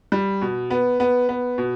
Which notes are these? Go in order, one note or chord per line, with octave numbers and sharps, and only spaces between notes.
G3
B2
B3
B3
B3
B2